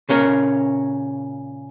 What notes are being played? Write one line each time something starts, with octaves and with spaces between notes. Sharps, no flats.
A#2 C#3 C#4 A#4